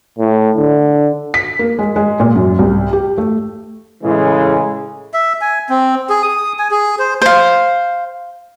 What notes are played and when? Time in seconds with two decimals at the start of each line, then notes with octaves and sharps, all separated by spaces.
0.19 A2
0.57 D3
1.34 B6
1.59 A#3
1.79 G#3
1.96 G#3
2.20 A#2
2.35 F#2
2.59 C2
2.93 G4
3.18 A3
4.03 A2 C#3 E3 G#3
5.14 E5
5.41 G#5
5.69 C4
6.10 G#4
6.23 D#6
6.59 G#5
6.71 G#4
6.99 C5
7.22 C5 F5